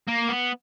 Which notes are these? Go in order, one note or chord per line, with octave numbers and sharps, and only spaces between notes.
A#3
B3